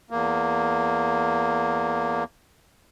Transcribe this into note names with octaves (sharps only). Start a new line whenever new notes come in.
E2 A#3